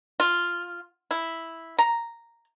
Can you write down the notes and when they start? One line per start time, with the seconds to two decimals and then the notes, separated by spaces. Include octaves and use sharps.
0.20 F4
1.11 E4
1.78 A#5